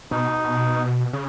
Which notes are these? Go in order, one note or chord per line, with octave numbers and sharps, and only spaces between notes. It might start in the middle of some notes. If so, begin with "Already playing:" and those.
B2 D#4
C#3